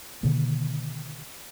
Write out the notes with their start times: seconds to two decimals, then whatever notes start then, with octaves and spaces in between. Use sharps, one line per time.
0.23 B2 D3 D#3 A#3